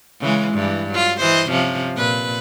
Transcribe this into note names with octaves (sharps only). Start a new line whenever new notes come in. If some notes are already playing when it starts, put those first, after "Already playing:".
C#3 E3 G#3
G2 E3
F#3 F4
E3 C5 D#5
C3 F3 C#4
A#2 B4